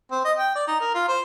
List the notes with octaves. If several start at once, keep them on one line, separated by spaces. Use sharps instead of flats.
C4
D#5
G5
D5
D#4
A#4
F4
C5